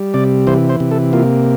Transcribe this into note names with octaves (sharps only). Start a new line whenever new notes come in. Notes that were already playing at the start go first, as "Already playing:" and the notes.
Already playing: G3
C3 D5
E3 C5
C5
C3
A4
A#3 F4